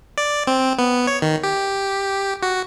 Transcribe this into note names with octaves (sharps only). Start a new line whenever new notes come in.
D5
C4
B3
C#5
D#3
G4
F#4